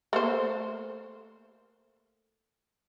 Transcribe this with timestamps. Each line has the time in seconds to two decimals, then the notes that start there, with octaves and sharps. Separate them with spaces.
0.13 A3 A#3 C5